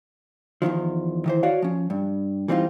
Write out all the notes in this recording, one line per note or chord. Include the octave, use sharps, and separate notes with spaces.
E2 G2 D#3 F3
D#3 E3 C5
F#4 C#5 D5 F5
F3 C#4
G2
E3 G3 C4 D#4 F4